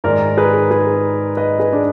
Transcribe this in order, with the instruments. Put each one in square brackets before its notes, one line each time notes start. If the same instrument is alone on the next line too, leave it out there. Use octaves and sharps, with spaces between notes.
[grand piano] G#2 D#3 G#3 A#4 D5
G#4 B4
G#4 B4
B4 D#5
G#4 B4
D4